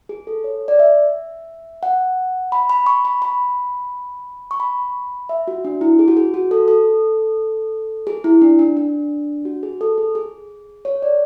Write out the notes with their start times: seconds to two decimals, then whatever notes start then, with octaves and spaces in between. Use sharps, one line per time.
0.09 G#4
0.27 A4
0.44 C#5
0.68 D5
0.79 E5
1.83 F#5
2.52 B5
2.70 B5
2.86 C#6
3.05 B5
3.22 B5
4.51 C#6
4.60 B5
5.29 E5
5.48 F#4
5.65 D4
5.81 E4
5.99 G#4
6.08 F#4
6.17 G#4
6.34 F#4
6.51 A4
6.68 A4
8.07 G#4
8.24 E4
8.42 D4
8.59 D4
8.77 D4
9.45 F#4
9.63 G#4
9.81 A4
9.98 G#4
10.15 G#4
10.85 C#5
11.02 D5